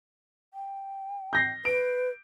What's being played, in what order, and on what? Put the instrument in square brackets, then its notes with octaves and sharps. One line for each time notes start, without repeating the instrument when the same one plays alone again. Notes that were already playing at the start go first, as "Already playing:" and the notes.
[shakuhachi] G5
[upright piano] G6 A#6 C7
[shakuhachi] B4 [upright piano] D7